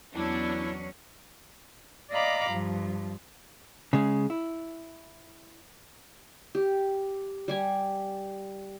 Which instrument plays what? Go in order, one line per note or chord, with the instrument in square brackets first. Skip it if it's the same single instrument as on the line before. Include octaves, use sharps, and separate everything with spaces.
[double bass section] E2 B3 [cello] F#3 C#4 [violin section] D4 [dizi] E4
[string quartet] D5 D#5 F5 A#5 B5 D6
G2 F3
[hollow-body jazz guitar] C#3 G#3
E4
[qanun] G4
G3 G4 G#5